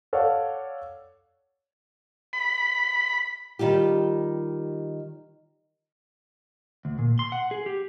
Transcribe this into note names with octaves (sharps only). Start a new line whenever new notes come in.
A4 C#5 D5 F5 F#5
B5
D#3 G3 F4 G4
D2
A#2
C6
F#5
G#4
G4